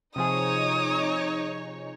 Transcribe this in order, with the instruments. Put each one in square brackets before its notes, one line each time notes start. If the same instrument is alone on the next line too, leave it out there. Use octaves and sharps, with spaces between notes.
[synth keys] C3 F3 G#4 [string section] D#4 C#5 [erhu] D#6